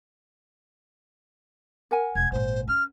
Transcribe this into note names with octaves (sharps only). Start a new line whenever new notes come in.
A#4 F#5 G#5
E1 G#6
G#1 A#2 C5
C#4 F6